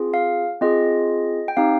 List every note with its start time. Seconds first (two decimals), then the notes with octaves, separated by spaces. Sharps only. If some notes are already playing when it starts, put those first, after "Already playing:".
Already playing: C4 F4 G#4
0.14 F5
0.61 C4 F4 G#4 D#5
1.48 G5
1.57 C4 D#4 G4 F5